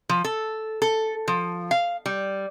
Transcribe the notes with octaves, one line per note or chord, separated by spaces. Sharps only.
F3
A4
A4
F3
F5
G3